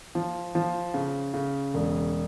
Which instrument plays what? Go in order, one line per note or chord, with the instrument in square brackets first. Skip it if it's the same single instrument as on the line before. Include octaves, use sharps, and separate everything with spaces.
[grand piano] F3
F3
C#3
C#3
E1